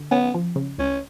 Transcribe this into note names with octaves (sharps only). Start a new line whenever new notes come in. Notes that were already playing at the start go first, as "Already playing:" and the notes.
Already playing: D3
B3 C#4
F3
C#3
C#2 C#4